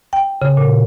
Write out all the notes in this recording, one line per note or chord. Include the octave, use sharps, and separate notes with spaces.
G5
C#3
A#2